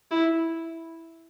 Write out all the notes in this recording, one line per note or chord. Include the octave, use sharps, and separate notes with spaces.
E4